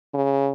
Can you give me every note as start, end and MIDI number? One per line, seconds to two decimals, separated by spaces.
0.14 0.52 49